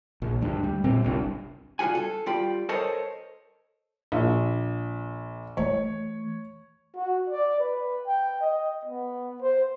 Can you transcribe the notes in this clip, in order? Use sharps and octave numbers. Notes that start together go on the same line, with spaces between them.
A#1
D2 G2
G3
A#2 C4
G1 C2 G2
G2 E3 F4 F#4 G#5
A4
G3 F4 G5 B5
A4 A#4 C5 C#5 D#5 A5
A#1
E3 A3 C#5
F#4
D5
B4
G5
D#5
B3
C5